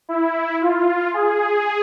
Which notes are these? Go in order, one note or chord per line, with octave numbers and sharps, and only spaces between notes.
E4
F4
G#4